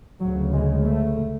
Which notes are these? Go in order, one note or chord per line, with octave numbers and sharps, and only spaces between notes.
D2 C#3 F#3
G#3
A3